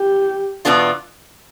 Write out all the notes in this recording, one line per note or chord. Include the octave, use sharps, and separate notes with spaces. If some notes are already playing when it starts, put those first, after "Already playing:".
Already playing: G4
E2 B2 B3 D4 F4